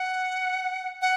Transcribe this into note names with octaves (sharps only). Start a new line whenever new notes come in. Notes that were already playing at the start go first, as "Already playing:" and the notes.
Already playing: F#5
F#5